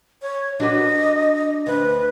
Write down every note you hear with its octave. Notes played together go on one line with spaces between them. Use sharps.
C#5
D4 F#4 B4 D#5
D2 B4